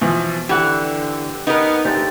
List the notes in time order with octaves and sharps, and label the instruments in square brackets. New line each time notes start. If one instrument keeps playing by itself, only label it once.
[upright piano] B2 E3 F3
[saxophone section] D3 [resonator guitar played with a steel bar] E3 [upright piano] G4 [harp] F#5 G#6
[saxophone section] B3 [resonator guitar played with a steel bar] D#4 A#4
[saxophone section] D3 A3 [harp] C4 G4 A5